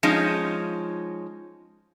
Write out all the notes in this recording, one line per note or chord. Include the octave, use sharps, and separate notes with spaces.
F3 G#3 C#4 D#4